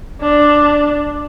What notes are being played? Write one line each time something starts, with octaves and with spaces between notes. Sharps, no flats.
D4